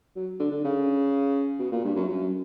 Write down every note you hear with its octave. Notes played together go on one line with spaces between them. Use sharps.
F#3
D3
D3
C#3
B2
A#2
G2
F#2
F#2